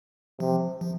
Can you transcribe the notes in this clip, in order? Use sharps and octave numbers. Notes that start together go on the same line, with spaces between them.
C3 F3
F3